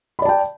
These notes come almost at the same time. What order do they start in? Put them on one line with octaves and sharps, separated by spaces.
B5 D5 A5 G5